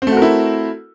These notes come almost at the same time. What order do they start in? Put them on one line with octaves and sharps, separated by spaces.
C4 A3 F#4 A#4 E4